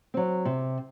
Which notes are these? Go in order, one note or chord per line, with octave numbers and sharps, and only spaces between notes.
F#3 C4
C3